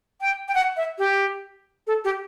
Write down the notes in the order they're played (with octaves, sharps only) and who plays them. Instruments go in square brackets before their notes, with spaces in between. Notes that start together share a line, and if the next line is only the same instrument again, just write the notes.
[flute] G5
G5
F#5
E5
G4
A4
G4